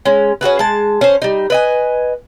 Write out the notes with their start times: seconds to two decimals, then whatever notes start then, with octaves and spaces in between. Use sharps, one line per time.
0.05 G#3 C#4
0.41 C#4 F#4 G#4 B4
0.59 G#3 A5
1.01 C#4 C5
1.22 G3 D#4
1.50 B4 D#5 G#5